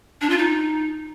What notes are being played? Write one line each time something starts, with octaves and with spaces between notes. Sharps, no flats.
D4
F4
D#4